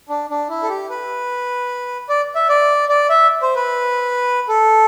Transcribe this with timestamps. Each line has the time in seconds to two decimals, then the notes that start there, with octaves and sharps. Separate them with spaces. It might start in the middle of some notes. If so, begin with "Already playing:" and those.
0.09 D4
0.30 D4
0.49 E4
0.63 A4
0.69 G4
0.90 B4
2.09 D5
2.35 E5
2.49 D5
2.89 D5
3.09 E5
3.42 C5
3.56 B4
4.48 A4